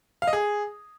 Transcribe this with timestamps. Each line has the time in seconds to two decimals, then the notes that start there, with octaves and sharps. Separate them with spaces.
0.22 F5
0.27 D#5
0.33 G#4